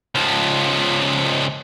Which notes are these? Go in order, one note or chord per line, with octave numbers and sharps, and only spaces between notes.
C#2 F3